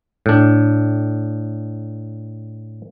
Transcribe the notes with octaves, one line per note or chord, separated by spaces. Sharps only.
A2 D4